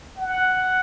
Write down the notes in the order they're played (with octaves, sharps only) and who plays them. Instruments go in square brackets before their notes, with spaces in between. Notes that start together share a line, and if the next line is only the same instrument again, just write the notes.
[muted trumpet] F#5